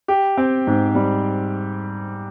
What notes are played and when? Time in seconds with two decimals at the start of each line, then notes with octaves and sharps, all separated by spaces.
0.08 G4
0.37 C4
0.67 G#2
0.95 G3